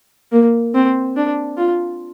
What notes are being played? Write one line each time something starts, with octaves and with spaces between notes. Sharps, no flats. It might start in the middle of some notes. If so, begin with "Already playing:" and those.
A#3
C4
D4
F4